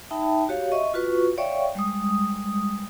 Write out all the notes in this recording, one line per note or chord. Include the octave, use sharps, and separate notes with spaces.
D#4 E5 G5 A5 B5
F#4 G4 C#5 F5
D#5 E5 C#6
F4 F#4 B4 C#6
C#5 D5 E5 F5 G5 C#6
G3 G#3 D#6